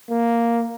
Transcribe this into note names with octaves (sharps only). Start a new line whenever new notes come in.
A#3